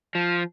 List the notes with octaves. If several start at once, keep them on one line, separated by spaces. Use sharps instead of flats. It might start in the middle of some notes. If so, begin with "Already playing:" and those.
F3